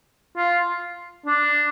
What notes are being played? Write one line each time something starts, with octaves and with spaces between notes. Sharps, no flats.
F4
D4